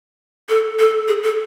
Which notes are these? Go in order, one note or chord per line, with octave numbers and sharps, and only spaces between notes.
A4
A4
G#4
A4